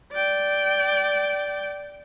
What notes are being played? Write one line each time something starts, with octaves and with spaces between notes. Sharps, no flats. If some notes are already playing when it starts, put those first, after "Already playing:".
D5 G5